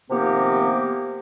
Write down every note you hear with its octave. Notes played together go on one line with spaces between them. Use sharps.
C3 D#3 F3 A#3 B3 G4